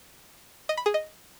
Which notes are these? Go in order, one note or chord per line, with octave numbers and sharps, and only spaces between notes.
D#5
B5
G#4
D#5